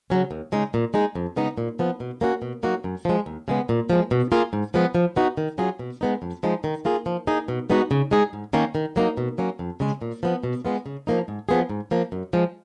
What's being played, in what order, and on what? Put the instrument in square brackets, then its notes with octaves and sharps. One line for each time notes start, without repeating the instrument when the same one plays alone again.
[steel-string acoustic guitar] C#3 F#3 C#4
D#2
C#3 G#3 D#4
A#2
G#3 D#4 G#4
F2
C#3 G#3 B3 D#4
A#2
F3 B3
B2
A#3 C#4 F#4
B2
F#3 A#3 D#4 F#4
F#2
F3 G#3
D#2
C#3 G#3 B3
A#2
F3 G#3
B2
A#3 F4 G#4
G#2
F3 G#3 B3
F3
B3 D#4 F#4
D#3
F#3 C#4 F4 G#4
B2
G#3 B3 D#4
F2
F3 G#3 D#4
D#3
A#3 F4 G#4
F3
A#3 D#4 G#4
B2
G#3 B3 D#4 F#4
C#3
G#3 D#4 G#4
G#2
D#3 A#3 C#4
D#3
F#3 A#3 D#4
B2
F#3 A#3 C#4
F2
C#3 G#3
A#2
F3 B3
B2
G#3 B3 F4
C#3
F3 A#3 D#4
G#2
F3 B3 F4 G#4
G#2
F3 A#3
F#2
F3 G#3